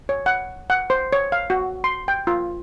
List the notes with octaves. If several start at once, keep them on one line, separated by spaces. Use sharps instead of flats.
C#5
F#5
F#5
C5
C#5
F5
F#4
C6
G5
F4